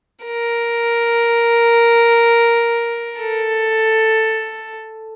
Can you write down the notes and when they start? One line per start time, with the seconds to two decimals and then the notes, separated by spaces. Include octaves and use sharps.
0.24 A#4
3.20 A4